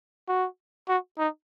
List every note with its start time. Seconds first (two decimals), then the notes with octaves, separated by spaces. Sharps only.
0.28 F#4
0.88 F#4
1.19 D#4